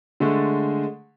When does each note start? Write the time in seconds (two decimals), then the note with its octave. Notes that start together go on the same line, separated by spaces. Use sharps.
0.20 D3 G#3 A3